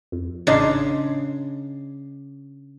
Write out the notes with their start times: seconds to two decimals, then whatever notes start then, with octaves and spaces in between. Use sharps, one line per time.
0.12 F2
0.47 A1 C#3 D4 D#4 C6